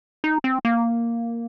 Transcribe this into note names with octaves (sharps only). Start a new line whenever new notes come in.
D#4
C4
A#3